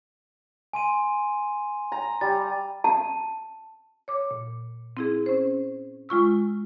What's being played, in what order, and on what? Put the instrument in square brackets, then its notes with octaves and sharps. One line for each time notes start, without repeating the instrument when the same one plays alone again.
[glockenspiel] G#5 C6 D#7
[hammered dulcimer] A#5
[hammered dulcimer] G3 [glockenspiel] A6
[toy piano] A5
[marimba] C#5 D6
A#2
C4 E4 G#4
C#4 C5
G#3 F4 C#6 E6